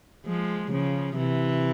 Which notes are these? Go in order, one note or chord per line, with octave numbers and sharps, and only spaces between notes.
F3 G#3
C#3 F3
C3 E3